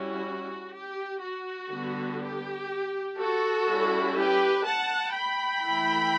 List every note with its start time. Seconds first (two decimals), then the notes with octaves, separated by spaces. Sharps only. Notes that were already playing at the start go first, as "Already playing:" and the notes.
Already playing: G3 C#4 E4 F#4
0.74 G4
1.23 F#4
1.72 D3 G3 B3
2.21 G4
3.18 F#4 A4
3.68 G3 C#4 E4
4.16 G4 B4
4.65 F#5 A5
5.14 G5 B5
5.63 E3 A3 E4